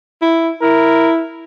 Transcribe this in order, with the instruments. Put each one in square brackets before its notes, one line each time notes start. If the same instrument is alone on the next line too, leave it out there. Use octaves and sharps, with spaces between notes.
[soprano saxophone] E4
[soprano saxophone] E4 [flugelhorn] A#4